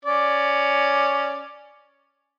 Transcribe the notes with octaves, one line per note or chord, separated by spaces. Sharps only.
C#4 D5